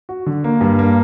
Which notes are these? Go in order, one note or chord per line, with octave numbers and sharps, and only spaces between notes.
F#4
D3
A#3
G2
A#3